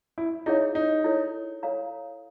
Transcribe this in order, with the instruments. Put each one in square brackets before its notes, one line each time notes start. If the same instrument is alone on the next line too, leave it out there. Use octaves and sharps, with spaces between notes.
[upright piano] E4
[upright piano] D#4 [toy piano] E4 G#4 C#5 E5
[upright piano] D#4
[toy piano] E4 A4 C#5
A4 C#5 F5 A#5